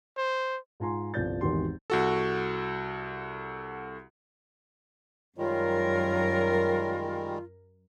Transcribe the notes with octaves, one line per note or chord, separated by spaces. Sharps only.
C5
G#2 F4 G#5 A#5 C6
G1 C2 F3 D5 G6 A6
G#1 E2 D#3 F#4 G4 C6
C2 F#4 A4
F#2 D#3 G3 G#3 F4 A#4 C#5